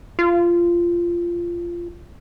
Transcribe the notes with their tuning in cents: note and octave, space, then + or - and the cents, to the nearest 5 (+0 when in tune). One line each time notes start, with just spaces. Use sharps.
F4 -15